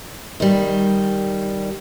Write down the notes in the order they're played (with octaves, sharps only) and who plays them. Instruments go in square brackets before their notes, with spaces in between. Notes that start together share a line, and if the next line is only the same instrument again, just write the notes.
[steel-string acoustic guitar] D#3 G3